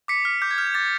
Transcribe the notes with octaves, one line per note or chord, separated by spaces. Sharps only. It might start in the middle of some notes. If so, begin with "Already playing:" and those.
D6 B6 C#7
F6 B6
D6 G6
G#6
F6 G6
G#6
D6 A6